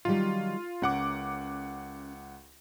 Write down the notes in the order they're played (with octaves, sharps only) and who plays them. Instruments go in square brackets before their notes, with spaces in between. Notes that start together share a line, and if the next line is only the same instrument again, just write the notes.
[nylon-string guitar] D#3 F#3 G3 [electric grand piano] F4
[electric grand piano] C#2 F#5 D6 [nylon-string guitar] C#4 A#4